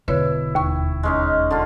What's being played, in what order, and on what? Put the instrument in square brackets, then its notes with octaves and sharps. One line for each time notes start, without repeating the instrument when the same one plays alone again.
[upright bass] E1 [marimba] D3 B4 C#5 [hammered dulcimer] E4
[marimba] D#2 C#6
[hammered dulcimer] G#3 C#4 D#4
D3 F4